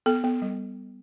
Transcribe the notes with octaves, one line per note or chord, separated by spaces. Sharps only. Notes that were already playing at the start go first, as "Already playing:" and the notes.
B3 A4
B3
G3